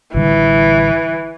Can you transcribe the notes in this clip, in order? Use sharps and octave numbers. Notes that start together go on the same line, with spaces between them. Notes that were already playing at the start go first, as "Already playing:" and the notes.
A1 D3 E3 G3